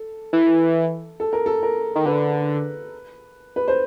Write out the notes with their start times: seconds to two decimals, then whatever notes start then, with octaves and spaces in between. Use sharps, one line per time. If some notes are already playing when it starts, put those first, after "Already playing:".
Already playing: A4
0.33 E3
1.20 A4
1.33 A#4
1.46 A4
1.63 A#4
1.95 D#3
2.05 D3 B4
3.56 B4
3.68 C5